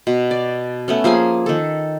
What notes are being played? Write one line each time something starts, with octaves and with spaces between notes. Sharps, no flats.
B2
D5
A3 B3 C#4
F3 A#3 G#4 G#5
D#3 A4